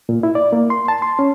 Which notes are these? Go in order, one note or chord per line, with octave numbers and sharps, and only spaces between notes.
A#2
E4
D5
A#3
C6
A5
C6
C#4